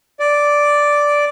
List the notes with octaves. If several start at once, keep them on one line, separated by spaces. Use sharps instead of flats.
D5